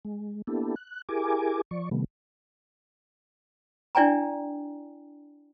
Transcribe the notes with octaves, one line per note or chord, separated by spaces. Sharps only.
G#3
A#3 B3 D4 E4 G4 A4
F#6
E4 G4 G#4 A#4 G#5 D6
F3 D5 C#6
C3 D#3 G3 A3 B3
D4 E4 D5 G5 G#5 A#5